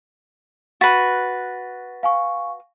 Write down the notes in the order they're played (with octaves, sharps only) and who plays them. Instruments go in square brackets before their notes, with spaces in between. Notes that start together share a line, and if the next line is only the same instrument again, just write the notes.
[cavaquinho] F#4 B4 [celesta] A6 B6
[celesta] F5 G#5 C#6